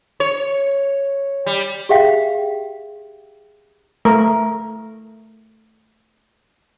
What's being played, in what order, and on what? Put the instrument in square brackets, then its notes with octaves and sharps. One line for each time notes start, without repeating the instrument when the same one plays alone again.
[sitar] C#5
G3
[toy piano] G4 G#4 E5 F5 G5
[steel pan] A3 A#4